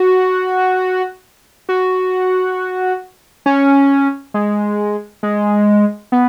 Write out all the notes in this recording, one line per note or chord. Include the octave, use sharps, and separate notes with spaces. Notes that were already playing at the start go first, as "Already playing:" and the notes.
Already playing: F#4
F#4
C#4
G#3
G#3
B3